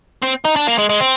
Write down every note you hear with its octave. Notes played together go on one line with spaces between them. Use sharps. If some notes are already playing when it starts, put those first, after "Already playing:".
C4
D#4
D4
A#3
G#3
G#3
C4